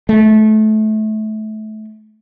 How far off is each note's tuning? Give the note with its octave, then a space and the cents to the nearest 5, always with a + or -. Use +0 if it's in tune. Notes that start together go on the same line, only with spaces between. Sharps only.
A3 -25